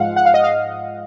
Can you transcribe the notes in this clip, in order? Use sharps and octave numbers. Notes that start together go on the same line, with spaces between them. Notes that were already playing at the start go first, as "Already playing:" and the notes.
Already playing: G#2 F3 G#3 F5 F#5
F#5
F5
D#5
F5